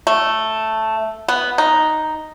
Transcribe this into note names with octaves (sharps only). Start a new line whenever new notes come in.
A3
B3
D#4